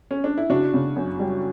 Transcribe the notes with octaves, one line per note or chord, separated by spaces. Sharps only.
C#4
D4
E4
C#3 D4 F#4
C#3
F#2
G3